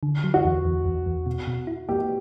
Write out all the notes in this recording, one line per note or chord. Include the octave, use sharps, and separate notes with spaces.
D3
F#3
F#4
E2
E2
E2
E2
B2
B2
E4
A#3 G4